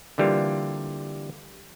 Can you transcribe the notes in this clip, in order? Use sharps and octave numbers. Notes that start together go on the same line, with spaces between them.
D3 E3 G3 A#3 F4